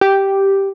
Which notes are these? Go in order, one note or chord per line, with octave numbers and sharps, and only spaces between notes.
G4